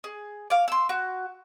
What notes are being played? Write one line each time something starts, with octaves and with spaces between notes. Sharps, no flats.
G#4
F5 D6
C6 E6
F#4